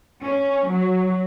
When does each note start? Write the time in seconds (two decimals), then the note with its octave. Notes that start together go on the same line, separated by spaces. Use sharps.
0.23 C#4
0.69 F#3